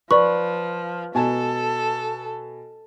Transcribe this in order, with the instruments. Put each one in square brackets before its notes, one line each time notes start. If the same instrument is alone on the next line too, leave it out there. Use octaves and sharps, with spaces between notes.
[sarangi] F3 [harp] B4 [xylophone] D5 C#6
[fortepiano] B2 G#5 A5 [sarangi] A4